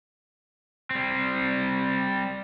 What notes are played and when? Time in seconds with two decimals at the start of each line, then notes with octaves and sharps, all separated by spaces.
0.91 G3 C4